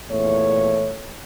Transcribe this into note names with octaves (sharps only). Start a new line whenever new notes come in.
E2 A#2 A3 C#5